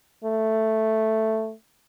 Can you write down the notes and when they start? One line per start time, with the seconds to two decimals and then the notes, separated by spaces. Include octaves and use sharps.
0.24 A3